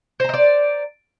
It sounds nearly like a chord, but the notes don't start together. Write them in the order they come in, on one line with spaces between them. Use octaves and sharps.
C5 A#5 D#5 D5